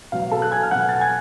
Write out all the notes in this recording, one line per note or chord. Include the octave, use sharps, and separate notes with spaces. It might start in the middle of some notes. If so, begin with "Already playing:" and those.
B2 F#3 F5
A4 A5
F#6
G#5 G#6
F6
B2 F#3 F#5 F#6
A6
G#5 G#6